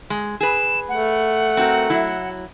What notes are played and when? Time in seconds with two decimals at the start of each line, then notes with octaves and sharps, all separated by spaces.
0.10 G#3
0.41 G#4 B4 E7
0.89 A3 F#5
1.57 C4 F#4 A#4
1.90 F#3 E4